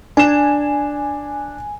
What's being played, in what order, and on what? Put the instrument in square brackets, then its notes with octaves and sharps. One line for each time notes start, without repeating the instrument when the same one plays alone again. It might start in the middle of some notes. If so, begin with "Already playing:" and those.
[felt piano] D4 E7 [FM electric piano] G#5